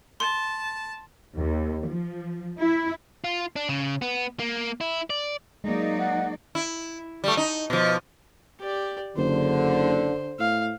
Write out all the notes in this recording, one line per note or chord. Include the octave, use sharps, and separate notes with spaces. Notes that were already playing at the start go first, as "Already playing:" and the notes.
A5 C6
D#2
F3
E4
F4
D4
C#3
B3
A#3
E4
D5
F#3 G#3 A#3 D#4 D5
F#5
E4
G3 A3
D#4
B2 F3
G4 D5
F#1 D3 C5
A2 F5